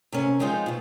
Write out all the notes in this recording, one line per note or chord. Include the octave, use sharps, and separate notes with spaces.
C3 A#3 C#4
F3 G#3 C4 D#4 F4 C5
G2 B2